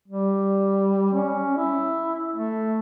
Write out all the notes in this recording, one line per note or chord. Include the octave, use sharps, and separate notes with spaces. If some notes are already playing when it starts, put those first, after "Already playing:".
G3
C#4
E4
A3